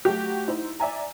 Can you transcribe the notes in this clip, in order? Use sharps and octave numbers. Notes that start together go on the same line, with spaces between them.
F#3 A3 F#4 G4
D#4 E4 C5
D5 E5 G#5 A#5